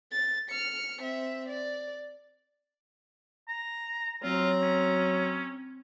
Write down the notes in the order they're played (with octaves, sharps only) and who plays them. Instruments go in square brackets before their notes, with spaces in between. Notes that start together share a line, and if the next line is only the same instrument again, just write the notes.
[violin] A6
F6 C#7
C4 E5
D5
[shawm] A#5
[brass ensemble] F#3 C#5 [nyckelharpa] C4 A#5 [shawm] F4
[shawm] C#4